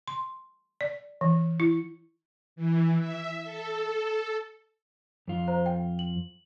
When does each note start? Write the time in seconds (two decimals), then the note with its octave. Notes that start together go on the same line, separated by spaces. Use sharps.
0.07 C6
0.81 D5
1.21 E3
1.60 E4
2.56 E3
2.99 E5
3.44 A4
5.28 F2 F4
5.48 C5 A#5
5.66 G5
5.99 F#7